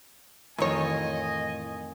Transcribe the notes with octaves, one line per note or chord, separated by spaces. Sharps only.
F2 A2 D#3 E3 F#3 C#5 D#5 G#5